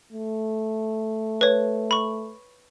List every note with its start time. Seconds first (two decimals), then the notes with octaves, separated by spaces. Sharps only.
0.13 A3
1.41 B4 C#5
1.91 B5 C#6